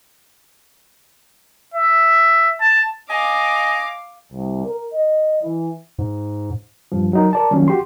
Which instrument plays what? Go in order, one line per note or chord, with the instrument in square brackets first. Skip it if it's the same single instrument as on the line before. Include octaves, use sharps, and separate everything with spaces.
[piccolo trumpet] E5
A5
[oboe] D#5 [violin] F5 D6 [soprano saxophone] G#5
[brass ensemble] C2
A#4
D#5
E3
[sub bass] G#2
[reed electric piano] G2 F3
F#3 D#4 A#4
A#4 D5 A5
D#3 F3 F#3 A#3 C#4
F#4 G4 C6